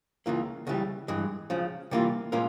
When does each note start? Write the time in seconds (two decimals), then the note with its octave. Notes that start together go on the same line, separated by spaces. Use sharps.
0.26 C#2 C#3 E3 A#3 F4
0.67 C#2 C#3 E3 G3
1.08 G2 E3 G#3
1.50 C#2 C#3 F3
1.91 C3 E3 G3 A#3 F4
2.32 A#2 G#3 C#4 F4 A#4